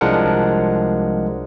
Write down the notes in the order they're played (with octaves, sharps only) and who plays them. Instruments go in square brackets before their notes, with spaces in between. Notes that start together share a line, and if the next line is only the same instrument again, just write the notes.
[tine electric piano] C2 F3 G#3 D4 A#4 F#5